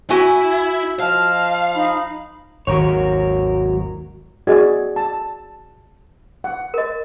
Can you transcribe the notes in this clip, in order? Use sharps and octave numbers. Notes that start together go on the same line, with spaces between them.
E4 F#4 E5 G#5
F3 D#5 F5 A5 F6
D#4 B5
G#1 D#2 D#3 F#3 A#4 C#5
F#4 G#4 D5 D#5
A5
F#5
A#4 D#5